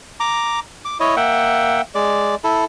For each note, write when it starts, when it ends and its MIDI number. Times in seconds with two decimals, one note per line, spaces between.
0.20 0.60 82
0.20 0.60 86
0.85 0.98 86
1.00 1.16 64
1.00 1.16 73
1.00 1.16 75
1.17 1.81 58
1.17 1.81 76
1.17 1.81 78
1.17 1.81 79
1.95 2.35 56
1.95 2.35 74
2.44 2.65 64
2.44 2.65 69